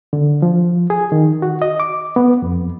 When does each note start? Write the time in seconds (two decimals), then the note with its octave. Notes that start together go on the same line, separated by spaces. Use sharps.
0.13 D3
0.42 F3
0.90 G#4
1.12 D#3
1.42 F#4
1.62 D#5
1.80 D6
2.16 B3
2.42 F2